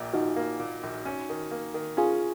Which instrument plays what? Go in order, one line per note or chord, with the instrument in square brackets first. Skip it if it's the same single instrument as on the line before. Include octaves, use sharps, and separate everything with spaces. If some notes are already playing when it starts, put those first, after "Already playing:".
Already playing: [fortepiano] A#1 A#2
[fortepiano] F3 [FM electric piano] D#4 F#4
[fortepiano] A#3
A#2
A#1
C#4
D#3
A#3
D#3
[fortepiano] C#4 [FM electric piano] F4 G#4